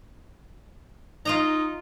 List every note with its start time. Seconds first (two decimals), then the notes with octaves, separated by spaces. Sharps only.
1.25 D#4 F4 D#5 A#5